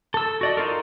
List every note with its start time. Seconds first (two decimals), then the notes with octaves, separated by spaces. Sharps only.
0.14 A4 E6
0.41 F#4 D5 D#5
0.57 D#4 F4 A4 A#4